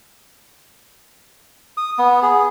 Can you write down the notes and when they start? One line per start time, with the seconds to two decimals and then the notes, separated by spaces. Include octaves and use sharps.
1.77 D#6
1.99 B3
2.22 G#4